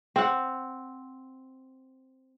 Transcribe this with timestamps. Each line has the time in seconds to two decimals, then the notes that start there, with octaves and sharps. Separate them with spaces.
0.16 C4 F#5